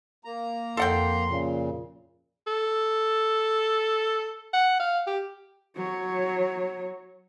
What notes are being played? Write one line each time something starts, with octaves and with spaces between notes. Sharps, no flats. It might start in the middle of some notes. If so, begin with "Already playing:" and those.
A#3 A#5
F2 A4 F#5 G5 C6
A#2 C#3
A4
F#5
F5
G4
F#3 C#5